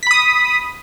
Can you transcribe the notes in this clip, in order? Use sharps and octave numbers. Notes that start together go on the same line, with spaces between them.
B5 D#6 B6